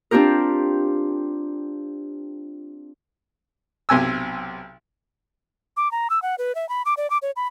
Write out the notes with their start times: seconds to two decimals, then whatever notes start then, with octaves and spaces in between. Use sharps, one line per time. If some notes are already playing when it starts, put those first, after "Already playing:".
0.11 C4 D4 F4 G4 A#4
3.89 B1 C3 G#5 E6
5.77 D6
5.91 A#5
6.10 E6
6.22 F#5
6.38 B4
6.55 E5
6.69 B5
6.85 D6
6.97 D5
7.10 D6
7.22 C#5
7.36 B5